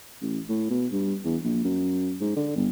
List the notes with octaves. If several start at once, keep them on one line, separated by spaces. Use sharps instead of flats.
A1
A2
B2
G2
E2
A#1
F#2
G#2
D3
G1